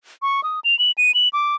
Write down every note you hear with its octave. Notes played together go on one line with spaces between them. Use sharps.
C#6
D#6
F7
F#7
D#7
F#7
D6